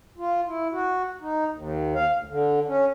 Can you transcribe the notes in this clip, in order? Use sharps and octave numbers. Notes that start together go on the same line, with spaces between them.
F4
E4
F#4
D#4
D#2
F5
D2
D3
C#4